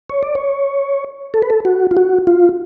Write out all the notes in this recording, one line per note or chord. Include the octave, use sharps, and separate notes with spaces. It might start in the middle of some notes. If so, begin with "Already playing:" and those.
C#5
D5
C#5
A4
B4
A4
F#4
F4
F#4
F4